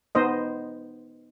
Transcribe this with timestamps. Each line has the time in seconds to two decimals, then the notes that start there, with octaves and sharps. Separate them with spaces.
0.15 B3 D#4 C5 D#5